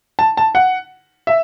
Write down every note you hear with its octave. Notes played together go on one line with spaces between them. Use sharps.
A5
A5
F#5
E5